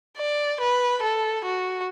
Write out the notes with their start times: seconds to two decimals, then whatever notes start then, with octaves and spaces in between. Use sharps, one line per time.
0.17 D5
0.60 B4
1.02 A4
1.45 F#4